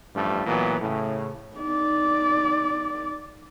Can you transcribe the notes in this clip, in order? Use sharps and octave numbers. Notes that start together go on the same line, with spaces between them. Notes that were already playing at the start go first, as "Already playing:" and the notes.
A1 G2 F3 A3
A#2 E3 F#3 B3
A2 C#3
D#4 D5